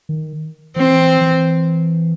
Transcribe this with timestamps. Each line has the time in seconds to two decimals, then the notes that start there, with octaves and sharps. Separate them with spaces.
0.09 D#3
0.76 E3 C4
1.21 E3